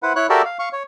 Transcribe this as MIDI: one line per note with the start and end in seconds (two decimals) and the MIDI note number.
0.03 0.13 64
0.03 0.13 71
0.03 0.13 72
0.03 0.13 78
0.16 0.27 64
0.16 0.27 73
0.16 0.27 90
0.30 0.42 66
0.30 0.42 67
0.30 0.42 69
0.30 0.42 70
0.30 0.42 74
0.30 0.42 76
0.45 0.58 77
0.59 0.69 77
0.59 0.69 85
0.73 0.83 73